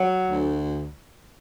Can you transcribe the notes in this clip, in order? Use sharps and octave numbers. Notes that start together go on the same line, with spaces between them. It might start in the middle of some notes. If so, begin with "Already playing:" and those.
Already playing: F#3
D2